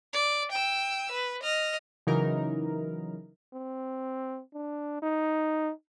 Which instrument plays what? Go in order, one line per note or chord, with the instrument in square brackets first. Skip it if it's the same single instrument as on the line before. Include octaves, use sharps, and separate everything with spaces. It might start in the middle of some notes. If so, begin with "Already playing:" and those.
[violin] D5
G5 E6
B4
D#5 F6
[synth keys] C#3 E3 F#3 D#4 A#4
[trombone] C4
D4
D#4